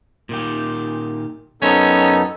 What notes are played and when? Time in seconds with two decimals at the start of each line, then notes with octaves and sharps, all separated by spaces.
0.29 A#2 D#3 G4
1.62 F#2 B3 C#4 D#4 A4 A#4 C5